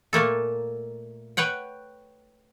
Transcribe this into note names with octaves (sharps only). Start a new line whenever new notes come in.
A#2 A3 A#3 A4
B4 C#5 F#5 G5